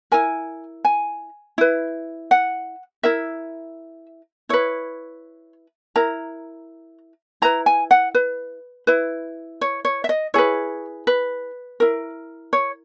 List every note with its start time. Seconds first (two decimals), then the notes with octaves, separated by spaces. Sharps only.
0.12 E4 A#4 G#5
0.85 G#5
1.58 E4 B4
2.31 F#5
3.03 E4 A#4 E5
4.49 E4 B4 C#5
5.96 E4 A#4 A#5
7.42 E4 B4 A#5
7.66 G#5
7.91 F#5
8.15 B4
8.87 E4 B4
9.61 C#5
9.85 C#5
10.04 E5
10.09 D#5
10.34 E4 G#4 B4 C#5
11.07 B4
11.80 E4 A#4
12.53 C#5